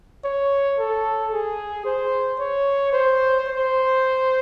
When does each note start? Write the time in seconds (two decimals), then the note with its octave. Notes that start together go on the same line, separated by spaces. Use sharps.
0.24 C#5
0.79 A4
1.32 G#4
1.85 C5
2.39 C#5
2.93 C5
3.48 C5